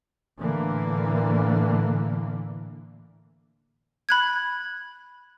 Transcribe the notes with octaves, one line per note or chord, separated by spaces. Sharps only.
A2 D3 E3 A#3
B5 F#6 G#6